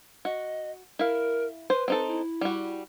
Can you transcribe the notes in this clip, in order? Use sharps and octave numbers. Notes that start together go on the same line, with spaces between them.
F#4 D#5
E4 A#4 F5
B4 C5
C4 D#4 A4
E4
G3 F#4